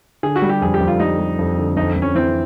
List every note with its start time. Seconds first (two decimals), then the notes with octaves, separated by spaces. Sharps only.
0.23 D3 G#4
0.36 F#4
0.42 G3
0.49 G4
0.61 F2 G#4
0.74 G4
0.80 F2
0.88 F4
1.00 G3 D#4
1.19 G3
1.39 F2
1.58 D3
1.76 F2 D#4
1.96 F2
2.02 C#4
2.15 E3 C4